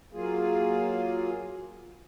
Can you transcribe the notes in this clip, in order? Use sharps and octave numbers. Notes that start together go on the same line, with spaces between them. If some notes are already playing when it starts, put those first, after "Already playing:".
F#3 A#3 F4 G#4